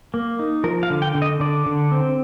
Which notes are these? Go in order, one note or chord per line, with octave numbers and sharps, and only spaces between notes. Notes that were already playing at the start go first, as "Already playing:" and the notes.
A#3
D#4
F3 A#4
F5
D3
G5
D3
D#5
D3 D5
D3
C4